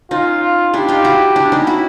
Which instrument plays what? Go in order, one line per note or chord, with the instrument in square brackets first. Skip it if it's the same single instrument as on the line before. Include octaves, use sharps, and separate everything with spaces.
[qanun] C#4 D#4 [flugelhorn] F4
[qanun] D4 E4 [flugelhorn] G4
[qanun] D#4 F4
E4 F#4
D4 E4
C#4 D#4
E4 F#4